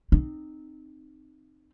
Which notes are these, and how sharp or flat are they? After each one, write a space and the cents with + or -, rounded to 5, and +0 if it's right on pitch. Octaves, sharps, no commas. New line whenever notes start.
C4 +0 D#4 -20